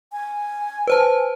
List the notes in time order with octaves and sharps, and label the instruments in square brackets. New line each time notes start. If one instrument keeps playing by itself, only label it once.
[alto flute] G#5
[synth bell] B4 C5 A5